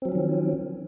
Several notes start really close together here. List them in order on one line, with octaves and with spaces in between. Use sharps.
C4 F#3 C#4 F3 D#3